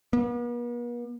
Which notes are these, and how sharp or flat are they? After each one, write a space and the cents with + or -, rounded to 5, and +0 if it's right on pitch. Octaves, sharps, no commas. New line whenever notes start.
B3 -45